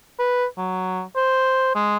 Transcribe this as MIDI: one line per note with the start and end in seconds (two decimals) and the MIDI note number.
0.19 0.45 71
0.57 1.02 54
1.16 1.71 72
1.75 1.97 56